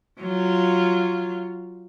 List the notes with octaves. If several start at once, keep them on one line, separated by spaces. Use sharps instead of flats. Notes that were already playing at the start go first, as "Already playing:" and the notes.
F#3 F4